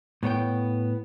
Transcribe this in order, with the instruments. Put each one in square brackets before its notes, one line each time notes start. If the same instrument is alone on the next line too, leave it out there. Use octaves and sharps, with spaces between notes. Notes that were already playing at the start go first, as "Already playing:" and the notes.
[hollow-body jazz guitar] A2 B3 C#5 G5